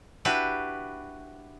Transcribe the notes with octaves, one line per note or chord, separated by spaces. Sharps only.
D4 E4 F#4 G4 B4